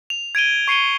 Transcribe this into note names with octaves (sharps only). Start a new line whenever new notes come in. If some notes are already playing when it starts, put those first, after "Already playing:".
F7
G#6 D7 D#7 G7
C#6 C7 C#7 D#7 G7